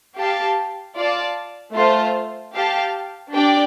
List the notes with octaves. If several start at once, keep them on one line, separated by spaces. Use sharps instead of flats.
G4 F5 A5
F4 D5 F5 A5
A3 F4 C5 F5 A5
G4 F5 A5
D4 G4 D5 G5